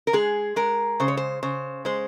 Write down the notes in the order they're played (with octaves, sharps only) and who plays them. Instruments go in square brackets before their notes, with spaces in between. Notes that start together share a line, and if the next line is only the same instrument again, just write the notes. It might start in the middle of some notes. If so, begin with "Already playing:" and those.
[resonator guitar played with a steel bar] A#4
G#3 G#4
G#3 A#4
C#3 C5
C#5
C5
C#3 C5
G#3 C5